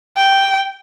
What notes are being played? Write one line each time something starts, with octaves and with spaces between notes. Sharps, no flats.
G5